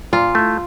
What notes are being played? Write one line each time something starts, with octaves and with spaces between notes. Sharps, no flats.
A#2 F4
A3 E4